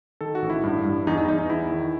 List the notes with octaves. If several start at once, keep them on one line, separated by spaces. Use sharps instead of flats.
D#3 A4
F#4
A1
E4
G2
G2
E2 D#4
D#4
E2 D#4
D#4
E2 E4
D#3